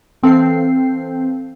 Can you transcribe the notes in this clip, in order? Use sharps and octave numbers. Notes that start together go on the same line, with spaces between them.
E3 C4 A4 F5 G6 C7